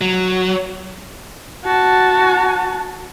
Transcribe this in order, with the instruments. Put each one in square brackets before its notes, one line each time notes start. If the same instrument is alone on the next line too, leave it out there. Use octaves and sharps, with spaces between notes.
[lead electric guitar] F#3
[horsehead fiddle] F#4 A5